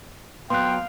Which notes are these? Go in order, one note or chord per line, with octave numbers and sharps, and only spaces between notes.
F#3 B3 F5 G5 C6 F#6